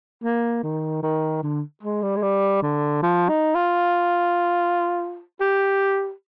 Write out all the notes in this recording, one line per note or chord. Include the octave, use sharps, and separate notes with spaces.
A#3
D#3
D#3
D3
G#3
G3
G#3
G3
D3
F3
D#4
F4
G4